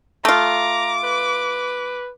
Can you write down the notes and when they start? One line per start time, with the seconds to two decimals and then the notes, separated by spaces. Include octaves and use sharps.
0.25 A3 F4 A#5 D6
1.04 B4